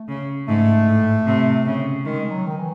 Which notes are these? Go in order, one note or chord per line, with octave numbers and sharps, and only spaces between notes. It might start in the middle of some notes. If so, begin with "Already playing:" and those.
Already playing: A3
C#3
G#2 A3
A2
C3
C#3
D#3 G#3
G#3
F#3
D#3
E3